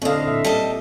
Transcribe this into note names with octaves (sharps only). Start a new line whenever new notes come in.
A2 D3 C4 D#5 F5
A#2 E5
G3 A4 D#5